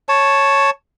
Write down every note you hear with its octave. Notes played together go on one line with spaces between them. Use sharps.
C#5 A5